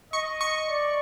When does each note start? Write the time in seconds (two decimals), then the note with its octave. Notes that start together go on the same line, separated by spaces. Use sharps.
0.13 D#5 C#6
0.41 C#6
0.68 D5